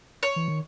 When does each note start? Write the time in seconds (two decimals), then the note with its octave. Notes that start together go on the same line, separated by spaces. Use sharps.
0.23 C#5
0.36 E3
0.48 D#3